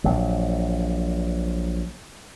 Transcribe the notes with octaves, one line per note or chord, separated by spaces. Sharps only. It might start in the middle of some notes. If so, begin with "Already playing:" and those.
A#1 F#3